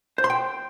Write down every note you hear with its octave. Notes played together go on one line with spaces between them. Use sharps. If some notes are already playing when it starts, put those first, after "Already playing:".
C5
C6
G5